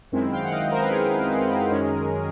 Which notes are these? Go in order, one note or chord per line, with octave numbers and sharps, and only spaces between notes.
F#2 D#3 G#3 C4 E4
F5 G5
F#5
D#5 F5
A#4 C5
B4
G#4 A#4
F#2 D#3 G#3 C#4